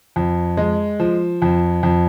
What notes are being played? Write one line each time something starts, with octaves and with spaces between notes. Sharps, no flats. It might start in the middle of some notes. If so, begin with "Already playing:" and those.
F2
G#3
F3
F2
F2